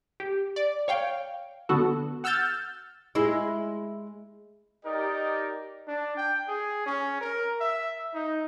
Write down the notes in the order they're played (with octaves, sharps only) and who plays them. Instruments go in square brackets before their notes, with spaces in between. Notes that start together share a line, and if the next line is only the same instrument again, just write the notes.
[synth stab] G4
D5
C#5 F5 G5
D3 B3 F#4 A4
F#5 E6 F6 G6 A6
[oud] G#3 E4
[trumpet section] D#4 G4 A#4 D5 D#5
[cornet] D4
G5
G#4
C#4
A#4
E5
D#4